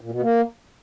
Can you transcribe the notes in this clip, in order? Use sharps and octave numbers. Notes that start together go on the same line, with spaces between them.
A#2
B2
A#3